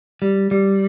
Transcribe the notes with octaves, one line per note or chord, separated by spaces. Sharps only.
G3
G3